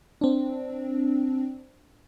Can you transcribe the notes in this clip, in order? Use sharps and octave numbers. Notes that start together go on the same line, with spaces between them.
C4 D4